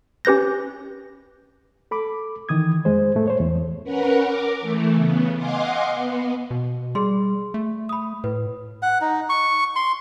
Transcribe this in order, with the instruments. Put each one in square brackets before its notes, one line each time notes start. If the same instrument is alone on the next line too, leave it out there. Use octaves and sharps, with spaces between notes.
[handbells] C#4 G4 B4 G6 A#6
[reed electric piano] A4 B5 D6
D#3 E3 D#6 G#6
F2 G#3 C5
A2 A3
C5 C#5
E2
[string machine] C#4 A#4 B4 F#5
A#4 D6
E3 A3
C#3 B3
D#5 F5 F#5 G#5 C6 D6
B3
[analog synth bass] B2
[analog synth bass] G3 [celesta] G#4 C6
[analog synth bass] A3
[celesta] B5 D#6
[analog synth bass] A2 [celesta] B4
[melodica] F#5
D#4
C#6
C6